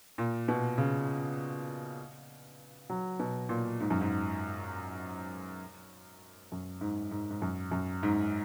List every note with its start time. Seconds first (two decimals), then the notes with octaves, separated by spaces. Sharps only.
0.18 A#2
0.48 B2
0.78 C#3
2.90 F#3
3.20 B2
3.49 A#2
3.80 G#2
3.90 F#2
4.01 G#2
6.52 F#2
6.81 G#2
7.11 G#2
7.31 G#2
7.42 F#2
7.71 F#2
8.03 G#2